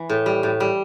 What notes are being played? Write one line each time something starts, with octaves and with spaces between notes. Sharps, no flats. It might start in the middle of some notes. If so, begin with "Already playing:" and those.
Already playing: E3
A2
G3
A2
G3